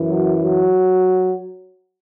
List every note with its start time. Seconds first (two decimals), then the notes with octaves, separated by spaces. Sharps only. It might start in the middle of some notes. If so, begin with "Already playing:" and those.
Already playing: F#2 E3
0.09 F#3
0.42 F#3